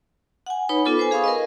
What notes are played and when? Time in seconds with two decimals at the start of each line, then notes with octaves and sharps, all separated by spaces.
0.46 F#5 G#5
0.69 D#4 B4 C#5 B5
0.85 B3 F4 A4 D6
0.97 B4 C5 G#5
1.11 G#4 F5 B5 C#6 D#6
1.24 A#4 B4 D#5